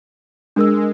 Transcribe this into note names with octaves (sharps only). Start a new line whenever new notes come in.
G#3 D4 A#4 E6